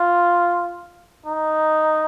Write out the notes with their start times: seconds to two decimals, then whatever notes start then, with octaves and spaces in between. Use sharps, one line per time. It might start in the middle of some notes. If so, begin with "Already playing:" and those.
Already playing: F4
1.27 D#4